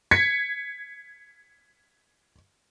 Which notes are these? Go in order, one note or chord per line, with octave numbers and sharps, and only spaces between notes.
G#6 B6 C#7